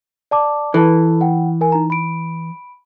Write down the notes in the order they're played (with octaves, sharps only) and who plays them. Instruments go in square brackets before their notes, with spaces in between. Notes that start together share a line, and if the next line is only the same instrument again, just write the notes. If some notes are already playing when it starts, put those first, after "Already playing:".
[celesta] D5 A5 D6
[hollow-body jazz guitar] E3 [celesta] A4 B4 A5
[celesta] F#5 G5
A#4 G#5
D#4 A#5
B5 D7